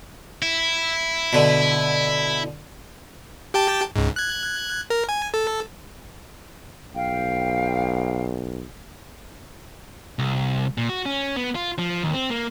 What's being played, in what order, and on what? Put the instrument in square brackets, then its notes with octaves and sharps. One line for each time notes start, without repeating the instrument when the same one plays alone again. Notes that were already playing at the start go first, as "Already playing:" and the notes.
[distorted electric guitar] E4
[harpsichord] B2 D3
[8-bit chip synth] G4 G5 A5
C#2 G#2
F#6 G#6
A#4
G#5
A4
[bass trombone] B1 [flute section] F5 G5
[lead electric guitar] C2
A#2
F#4
C#4
B3
F4
F3
D#2
C4
A#3